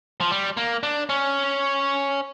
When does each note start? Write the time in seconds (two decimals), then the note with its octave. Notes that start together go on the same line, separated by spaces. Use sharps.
0.21 F3
0.31 G3
0.57 A#3
0.83 D4
1.09 C#4